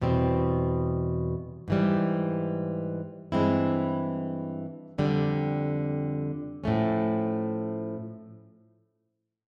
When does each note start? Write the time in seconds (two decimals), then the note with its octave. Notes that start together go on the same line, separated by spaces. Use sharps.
0.01 E2 B2 G3 C4
1.68 G#2 E3 G3
3.32 G2 E3 G#3 C4 E4
4.98 F2 D3 G3
6.64 A2 F3 A3 C#4